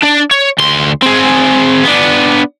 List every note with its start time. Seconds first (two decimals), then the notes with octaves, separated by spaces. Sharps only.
0.03 D4 D5
0.31 C#5
0.58 D2 C6
1.02 C4 G#4
1.84 B3 D4